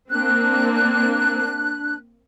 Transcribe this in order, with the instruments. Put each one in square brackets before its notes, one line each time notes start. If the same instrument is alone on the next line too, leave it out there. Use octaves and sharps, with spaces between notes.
[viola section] A#3 C4 [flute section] D4 F#6